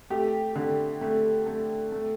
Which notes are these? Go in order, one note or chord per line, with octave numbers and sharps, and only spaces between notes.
A3 G4
D3
A3
A3
A3